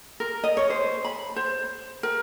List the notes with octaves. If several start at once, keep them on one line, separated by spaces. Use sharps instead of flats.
A#4
D#5
C#5
C5
B5
C5
A#4